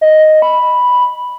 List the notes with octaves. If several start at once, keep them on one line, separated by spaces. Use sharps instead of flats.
D#5
B5